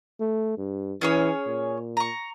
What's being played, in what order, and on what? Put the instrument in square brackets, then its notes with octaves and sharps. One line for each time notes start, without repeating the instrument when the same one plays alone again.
[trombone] A3
G2
[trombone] E3 [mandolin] C#4 G#4 C#5
[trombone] A#2
[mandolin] A#5 C#6